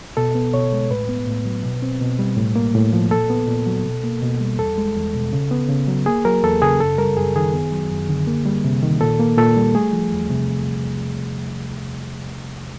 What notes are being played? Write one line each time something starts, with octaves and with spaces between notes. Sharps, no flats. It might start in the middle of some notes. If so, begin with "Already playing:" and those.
B2 A4
B3
B2 C#5
G#3
A2 B4
B3
A2
F#3
B2
C4
B2
G3
A2
A#3
A2
F3
A#2 A4
B3
A#2
F#3
B2
A#3
B2
G3
E2 A4
G#3
E2
B2
C#3
B3
C#3
F#3
A#3 G#4
F#3 A#4
E2 A4
C#3 G#4
F#2 A4
G3 A#4
F#2 G#4
D#3 G#4
B3
F#3
F#2
D3
A#3
G3
C3
D#3
A#2 A4
A#3
A#2 A4
G3
A3 G#4
F3
E2
C3